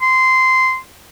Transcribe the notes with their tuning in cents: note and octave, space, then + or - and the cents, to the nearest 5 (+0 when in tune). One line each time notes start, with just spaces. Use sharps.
C6 -15